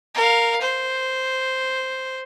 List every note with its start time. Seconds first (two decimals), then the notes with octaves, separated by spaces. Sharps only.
0.15 A#4 F5
0.61 C5